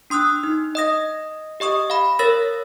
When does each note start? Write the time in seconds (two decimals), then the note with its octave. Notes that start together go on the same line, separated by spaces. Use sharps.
0.10 D4 C6 D#6 E6 F#6
0.44 D#4
0.75 D#5 D#6 A#6
1.60 G4 D#5 C#6 D#6
1.90 F5 B5
2.19 A#4 C#5 E6 A6 A#6